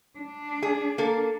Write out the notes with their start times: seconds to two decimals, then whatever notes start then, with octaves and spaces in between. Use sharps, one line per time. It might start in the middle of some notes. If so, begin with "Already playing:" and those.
0.19 D4
0.63 G#4
0.98 A#3 A4